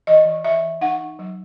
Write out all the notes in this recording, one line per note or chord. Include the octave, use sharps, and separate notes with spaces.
E3 D#5
E3
E3 E5
E3
D#4 F#5
D#4
F#3